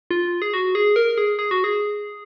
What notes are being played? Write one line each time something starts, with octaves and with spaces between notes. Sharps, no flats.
F4
G#4
F#4
G#4
A#4
G#4
G#4
F#4
G#4